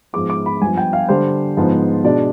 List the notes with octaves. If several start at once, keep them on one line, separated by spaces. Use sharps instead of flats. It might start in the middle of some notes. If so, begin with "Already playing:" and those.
G#2 F3 G#3 B3 D6
D6
B5
G2 F3 B3 G#5
G5
F5
D3 G3 D4 C5
G#2 F3 B3
B2 G#3 D4 D5